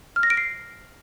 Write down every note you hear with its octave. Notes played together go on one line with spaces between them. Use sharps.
F6
A#6
D7
C7